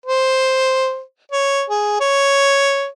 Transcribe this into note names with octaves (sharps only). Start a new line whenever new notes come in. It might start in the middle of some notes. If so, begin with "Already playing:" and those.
C5
C#5
G#4
C#5